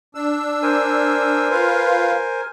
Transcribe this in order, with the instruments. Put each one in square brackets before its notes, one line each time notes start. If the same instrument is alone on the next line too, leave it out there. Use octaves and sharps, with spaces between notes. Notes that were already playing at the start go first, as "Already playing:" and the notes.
[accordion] D4 E6
[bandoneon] A#4 C5 G#5
[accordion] F4 B4 F5